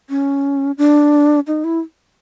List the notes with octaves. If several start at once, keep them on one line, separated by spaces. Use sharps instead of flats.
C#4
D4
D#4
E4